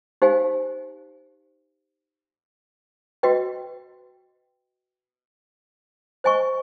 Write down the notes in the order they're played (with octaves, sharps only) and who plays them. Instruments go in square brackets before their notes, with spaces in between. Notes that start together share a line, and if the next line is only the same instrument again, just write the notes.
[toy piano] D#4 G4 C5 F5 G#5
F#4 B4 D#5 G5
C5 D#5 G#5 C#6